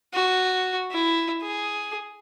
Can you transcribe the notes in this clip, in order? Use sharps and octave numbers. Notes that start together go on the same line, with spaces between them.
F#4
E4
G#4